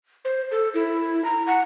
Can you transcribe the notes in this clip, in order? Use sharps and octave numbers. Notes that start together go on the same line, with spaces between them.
C5
A4
E4
A#5
F#5